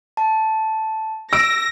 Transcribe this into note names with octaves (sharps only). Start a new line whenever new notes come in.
A5
E6 A#6 D7